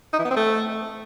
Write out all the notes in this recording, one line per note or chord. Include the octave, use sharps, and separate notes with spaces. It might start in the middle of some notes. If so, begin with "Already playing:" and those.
D#4
E3
B3
C4
A3